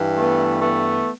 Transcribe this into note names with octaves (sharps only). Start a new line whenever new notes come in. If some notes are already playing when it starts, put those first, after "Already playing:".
Already playing: G2 E3
A3 B3
A3 B3